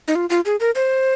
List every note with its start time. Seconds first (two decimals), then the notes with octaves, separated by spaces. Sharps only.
0.08 D#4
0.15 F4
0.30 F4
0.45 G#4
0.60 A#4
0.75 C5